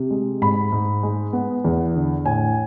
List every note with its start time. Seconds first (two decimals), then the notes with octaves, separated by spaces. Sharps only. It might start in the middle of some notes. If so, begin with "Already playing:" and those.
Already playing: C3
0.10 G#3
0.42 G#2 B5
0.72 G#2
1.03 G#3
1.33 B3
1.64 E2
1.95 D3
2.25 A2 G#5